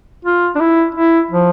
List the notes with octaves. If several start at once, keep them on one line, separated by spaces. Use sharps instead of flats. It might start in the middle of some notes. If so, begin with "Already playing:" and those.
F4
D4
E4
E4
F3